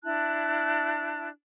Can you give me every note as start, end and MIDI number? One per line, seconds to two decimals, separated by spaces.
0.04 1.28 62
0.04 1.28 64
0.04 1.28 81
0.04 1.28 90